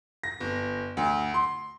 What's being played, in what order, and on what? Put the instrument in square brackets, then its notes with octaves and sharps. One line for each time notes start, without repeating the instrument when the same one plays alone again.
[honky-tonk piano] A#6
G1
D2
C6